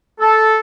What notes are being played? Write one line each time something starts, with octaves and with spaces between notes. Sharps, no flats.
A4